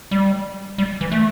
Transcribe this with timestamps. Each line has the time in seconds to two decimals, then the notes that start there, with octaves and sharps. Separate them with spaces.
0.11 G3
0.78 G3
1.01 E3
1.12 A3